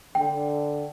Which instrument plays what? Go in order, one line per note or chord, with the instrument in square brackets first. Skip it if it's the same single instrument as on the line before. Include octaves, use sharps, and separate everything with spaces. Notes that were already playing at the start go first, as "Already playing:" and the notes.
[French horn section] D3 [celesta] G5